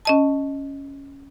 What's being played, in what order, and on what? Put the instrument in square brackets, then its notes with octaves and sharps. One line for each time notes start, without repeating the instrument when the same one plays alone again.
[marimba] C#4 D#5 A5